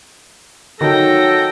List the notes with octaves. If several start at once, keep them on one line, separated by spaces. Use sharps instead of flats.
D#3 F#3 A4 G5 A#6